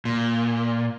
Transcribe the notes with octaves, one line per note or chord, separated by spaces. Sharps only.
A#2